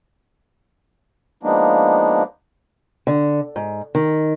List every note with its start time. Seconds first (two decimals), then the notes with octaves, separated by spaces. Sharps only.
1.43 F3 G#3 A#3 B3 D4 D#4
3.07 D3
3.56 G#2
3.95 D#3